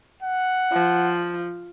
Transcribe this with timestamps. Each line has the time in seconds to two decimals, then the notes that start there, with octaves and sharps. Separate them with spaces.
0.22 F#5
0.73 F3